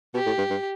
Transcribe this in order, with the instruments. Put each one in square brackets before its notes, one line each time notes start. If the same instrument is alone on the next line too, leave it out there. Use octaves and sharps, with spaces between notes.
[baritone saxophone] B2 [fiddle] G4
[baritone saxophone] A2
G2
G2